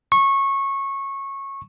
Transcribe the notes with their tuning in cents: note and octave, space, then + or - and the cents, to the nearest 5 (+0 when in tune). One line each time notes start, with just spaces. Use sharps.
C#6 -20